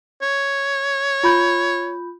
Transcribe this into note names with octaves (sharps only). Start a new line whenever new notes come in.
C#5
F4 B5 G6